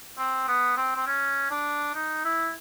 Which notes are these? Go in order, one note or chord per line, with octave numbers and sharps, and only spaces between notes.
C4
B3
C4
C4
C#4
D4
D#4
E4